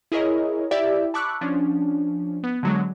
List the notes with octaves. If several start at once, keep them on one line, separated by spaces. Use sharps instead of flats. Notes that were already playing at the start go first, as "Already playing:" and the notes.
E4 G#4 A#4 C#5 D#5
E4 G4 D5 E5
A5 B5 C#6 D6 E6 F#6
F3 C#4 D4
B3
D3 F#3 G#3